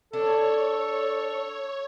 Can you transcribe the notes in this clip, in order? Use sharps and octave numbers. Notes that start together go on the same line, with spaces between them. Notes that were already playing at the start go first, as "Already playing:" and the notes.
D4 A4 C#5